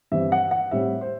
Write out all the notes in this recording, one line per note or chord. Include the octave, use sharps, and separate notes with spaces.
G2 E3 G3 C4 E5
F#5
F#5
A2 G3 C4 E5
C5